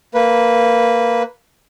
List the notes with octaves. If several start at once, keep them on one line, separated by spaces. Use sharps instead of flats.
A#3 B4